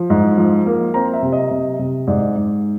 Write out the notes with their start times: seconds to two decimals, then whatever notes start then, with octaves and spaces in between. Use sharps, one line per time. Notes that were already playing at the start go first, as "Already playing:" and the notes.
Already playing: F3
0.10 G#2
0.38 F3
0.66 A#3
0.94 C4 A#5
1.14 E5
1.22 C3
1.32 D#5
1.51 C3
1.79 C3
2.07 G#2 D5
2.36 G#2